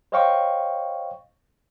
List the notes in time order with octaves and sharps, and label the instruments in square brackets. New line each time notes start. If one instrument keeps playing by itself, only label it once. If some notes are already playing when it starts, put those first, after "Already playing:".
[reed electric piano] C5 C#5 D#5 F5 G5 C#6